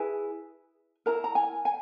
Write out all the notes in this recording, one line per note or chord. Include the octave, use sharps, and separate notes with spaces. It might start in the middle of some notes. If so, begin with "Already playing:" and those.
Already playing: E4 G#4 B4 G#5
E4 A#4 A#5
A#5
G#5
G#5